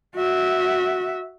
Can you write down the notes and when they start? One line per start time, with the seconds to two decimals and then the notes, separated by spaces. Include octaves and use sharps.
0.16 F#4 E5